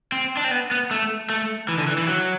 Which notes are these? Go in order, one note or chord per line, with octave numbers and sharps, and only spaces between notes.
C4
D4
C4
B3
B3
A3
A3
E3
D3
E3
E3
F#3